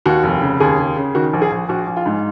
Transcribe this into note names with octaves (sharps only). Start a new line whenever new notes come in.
D#2 F#4
F1
C#3
D#2 G#4
C#3
C#3
D#3 F#4
A#1
G#4
A#1
A#1 F#4
A#1
F4
G#2